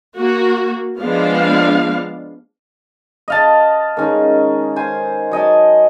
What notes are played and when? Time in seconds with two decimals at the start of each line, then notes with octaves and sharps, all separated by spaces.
0.15 A#3 F#4
0.99 F3 G#3 B3 D4 F5
3.28 D#5 F5 A5
3.97 D#3 G#3 C#4 A#4
4.76 C5 G#5
5.31 F#3 D#5 G#5 A5